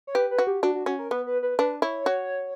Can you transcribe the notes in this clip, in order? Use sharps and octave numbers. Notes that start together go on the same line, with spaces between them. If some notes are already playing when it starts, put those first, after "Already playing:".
C#5
G4 B4
B4
F#4
G4
D4 F#4
F#4
C#4 F#4
A#4
B3 B4
B4
B4
D4 B4
E4 C#5
F#4